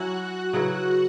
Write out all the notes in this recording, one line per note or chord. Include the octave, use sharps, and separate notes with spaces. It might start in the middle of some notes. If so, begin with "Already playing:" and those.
Already playing: F#3 C#4 E4 F#4 F#5
C#3 F#3 E4 B4